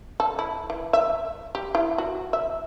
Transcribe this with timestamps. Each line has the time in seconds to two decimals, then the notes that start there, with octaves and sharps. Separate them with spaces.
0.20 A4
0.39 E4
0.70 E3
0.93 E5
1.55 G4
1.75 E4
1.98 F#4
2.33 E5